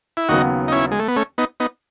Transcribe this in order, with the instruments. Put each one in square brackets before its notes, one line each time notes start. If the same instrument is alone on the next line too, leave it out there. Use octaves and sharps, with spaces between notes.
[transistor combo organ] E4
[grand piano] D#2 C#3 F#3 B3 [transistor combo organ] D#4 F#4
[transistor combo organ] D#4
C#4 E4
G#3
A3
B3
A3 C#4
B3 D#4
B3 D#4